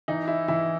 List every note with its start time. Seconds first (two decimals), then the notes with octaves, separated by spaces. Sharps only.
0.08 E3 D#4
0.28 E4
0.48 E3 E4